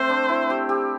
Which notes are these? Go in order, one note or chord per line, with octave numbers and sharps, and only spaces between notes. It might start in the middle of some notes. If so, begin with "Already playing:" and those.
Already playing: A3 C4 C5
D4
E4
G4
G4